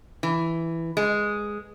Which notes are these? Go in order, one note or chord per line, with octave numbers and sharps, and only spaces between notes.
E3
G#3